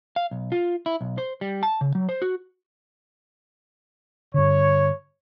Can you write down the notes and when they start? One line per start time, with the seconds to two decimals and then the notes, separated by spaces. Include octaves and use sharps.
0.16 F5
0.31 B1
0.52 F4
0.86 E4
1.01 B1
1.18 C5
1.41 G3
1.63 A5
1.81 C#3
1.95 F#3
2.09 C5
2.22 F#4
4.34 G2 D3 C#5